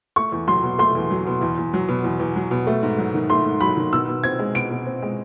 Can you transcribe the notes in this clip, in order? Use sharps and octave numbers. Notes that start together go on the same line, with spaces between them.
A3 C#6
E2
F#3 C6
B2
A3 C6
E2
F#3
B2
E2
E2
F#3
B2
E2
E2
F#3
B2
A3
G#2
F#3
D#3
A3 C6
G#2
F#3 B5
D#3
B2 E6
B2
C4 G#6
G#3
B2 D7
B2
C4
G#3